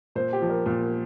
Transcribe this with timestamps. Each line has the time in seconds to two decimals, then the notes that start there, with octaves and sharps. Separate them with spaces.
0.15 A#2 C5
0.33 G4
0.42 F3
0.49 A#4
0.66 A#2